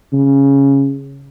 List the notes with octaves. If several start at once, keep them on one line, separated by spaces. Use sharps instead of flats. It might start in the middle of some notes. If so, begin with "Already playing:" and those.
C#3